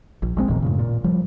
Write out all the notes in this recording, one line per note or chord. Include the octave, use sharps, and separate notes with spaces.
A#1
A#1 G#3 C4
F1 A#2 D#3 F3
F#2 A2 C#3
A#2
F3 G3